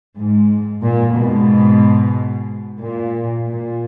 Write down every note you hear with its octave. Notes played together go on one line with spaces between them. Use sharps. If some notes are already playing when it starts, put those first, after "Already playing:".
G#2
A#2
G#2 B2
A#2
A#2